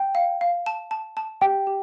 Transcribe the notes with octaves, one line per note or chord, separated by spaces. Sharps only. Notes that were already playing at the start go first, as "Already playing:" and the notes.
Already playing: G5
F5
F5
A5
A5
A5
G4 G5
G4